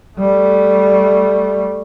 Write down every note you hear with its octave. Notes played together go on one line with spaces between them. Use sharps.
G3 A3